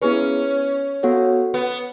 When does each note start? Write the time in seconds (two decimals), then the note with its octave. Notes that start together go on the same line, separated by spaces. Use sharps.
0.02 B3 C#4 E4 G#4 B4
1.03 B3 F#4 A4 C#5 F#5
1.54 B3